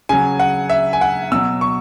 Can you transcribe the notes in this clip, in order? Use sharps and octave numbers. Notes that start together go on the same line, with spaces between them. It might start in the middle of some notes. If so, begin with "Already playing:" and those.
C#3 F#3 G#5
F#5
E5
G#5
F#5
B2 F#3 E6
C#6